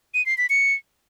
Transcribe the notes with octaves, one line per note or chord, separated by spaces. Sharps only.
D#7
C7
B6
C#7